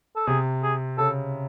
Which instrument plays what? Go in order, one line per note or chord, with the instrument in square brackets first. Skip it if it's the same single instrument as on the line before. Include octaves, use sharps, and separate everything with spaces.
[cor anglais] A4
[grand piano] C3 [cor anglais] G#4
[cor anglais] G#4
[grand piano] C#3 [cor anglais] A4